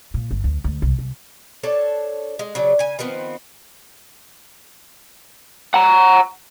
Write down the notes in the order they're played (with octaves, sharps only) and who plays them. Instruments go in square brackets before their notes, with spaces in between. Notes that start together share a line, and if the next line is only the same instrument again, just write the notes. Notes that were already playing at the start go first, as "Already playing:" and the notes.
[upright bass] A#2
G1
D2
D2
C2
C2
[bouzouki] D4 A4 C#5 A5
G#3
C#3 F#3 D4
C#3 G#5
D#3 F3 B3 C4
[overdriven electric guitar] F#5 A#5